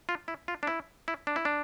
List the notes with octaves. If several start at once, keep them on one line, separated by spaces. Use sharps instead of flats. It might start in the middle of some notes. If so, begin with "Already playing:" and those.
F4
E4
F4
D4
E4
E4
D4
E4
D4